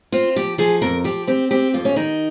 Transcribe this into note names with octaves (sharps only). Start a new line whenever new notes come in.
C4 F4
F3 G4
F3 G#4
F2 A#4
F3 G4
C4 G4
C4 G4
F2 F4
C#4
D#3 D#4